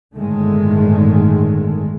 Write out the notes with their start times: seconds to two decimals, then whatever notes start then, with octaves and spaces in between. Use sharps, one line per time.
0.15 G1 A2 D3 D#3 G#3 A3